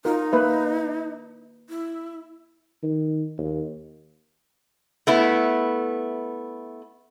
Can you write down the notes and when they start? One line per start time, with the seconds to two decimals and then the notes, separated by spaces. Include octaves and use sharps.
0.05 D#4 F4 A#4
0.32 A#3 B4 E5
1.69 E4
2.83 D#3
3.38 D#2
5.07 A3 B3 E4